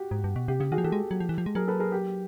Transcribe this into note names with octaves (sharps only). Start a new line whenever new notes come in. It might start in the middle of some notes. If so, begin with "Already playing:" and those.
Already playing: F#4 G4
G#2
G2
B2
C3 G4
C#3 G4
D#3 F#4 G#4
F3
E3 G4 A4
G#3
F#3
F3
E3
F3
G#3
F#3 G#4 A#4
A4 B4
G#4 A#4
G4